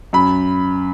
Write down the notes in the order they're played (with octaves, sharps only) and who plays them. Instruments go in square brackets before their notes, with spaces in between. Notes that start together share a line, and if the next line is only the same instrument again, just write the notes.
[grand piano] F#2 B5